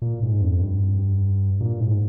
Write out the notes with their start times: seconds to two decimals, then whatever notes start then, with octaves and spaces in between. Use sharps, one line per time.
0.02 A#2
0.23 G#2
0.42 F2
0.61 G2
1.61 A#2
1.80 G#2